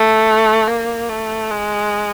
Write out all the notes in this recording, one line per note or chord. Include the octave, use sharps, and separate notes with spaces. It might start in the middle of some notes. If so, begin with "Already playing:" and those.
Already playing: A3
A#3
A3
G#3